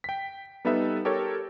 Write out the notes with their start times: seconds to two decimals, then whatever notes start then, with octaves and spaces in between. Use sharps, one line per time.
0.04 G5 B6
0.65 G3 B3 D#4 A4 B4 E5
1.05 G4 A4 A#4 C#5